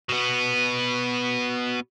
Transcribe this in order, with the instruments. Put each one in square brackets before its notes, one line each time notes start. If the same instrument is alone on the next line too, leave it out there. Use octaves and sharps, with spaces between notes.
[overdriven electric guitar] B2 B3